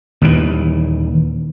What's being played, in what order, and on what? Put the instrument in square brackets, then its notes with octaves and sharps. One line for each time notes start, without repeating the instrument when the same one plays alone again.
[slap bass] D#2 A#2 E3